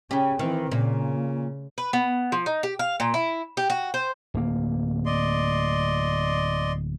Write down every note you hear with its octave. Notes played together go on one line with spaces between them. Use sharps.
C#3 C#4 G4
D#3 E3 C4
A#2 C#3
B4
B3
F3
D#4
G4
F5
A#2
E4
G4
F#4
C5
D1 A#3
D5 D#5 C6